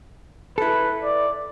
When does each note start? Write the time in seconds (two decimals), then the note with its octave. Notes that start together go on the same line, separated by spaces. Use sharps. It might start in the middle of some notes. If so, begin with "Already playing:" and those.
0.58 E4 A4 B4
1.03 D5